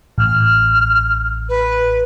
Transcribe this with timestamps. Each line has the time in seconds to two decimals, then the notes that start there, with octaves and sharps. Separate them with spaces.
0.18 A1 F6
1.48 B4